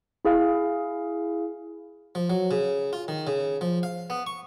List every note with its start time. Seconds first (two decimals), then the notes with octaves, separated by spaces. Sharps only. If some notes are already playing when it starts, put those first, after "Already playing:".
0.25 E4 G#4 F5
2.15 F3
2.30 F#3
2.51 C#3
2.93 F4
3.08 D#3
3.27 C#3
3.61 F3
3.83 F5
4.10 B3
4.27 C#6